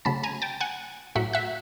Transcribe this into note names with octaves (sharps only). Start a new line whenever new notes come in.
C#3 F#3 A3 C#4 A5 B5
G#5 A#5
G5 A5
F#5 G#5
A2 F#3 A3 E5 F#5
E5 F#5